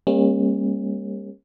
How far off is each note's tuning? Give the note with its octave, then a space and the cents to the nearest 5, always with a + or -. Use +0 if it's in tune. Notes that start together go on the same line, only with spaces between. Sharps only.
G3 +40 A#3 +0 C#4 -35